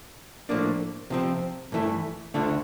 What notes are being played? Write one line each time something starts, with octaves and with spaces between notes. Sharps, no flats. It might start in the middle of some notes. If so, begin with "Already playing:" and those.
A2 F3 A#3 D4
C3 F3 C4
G2 E3 A3 E4
D2 D3 A3 D4 F4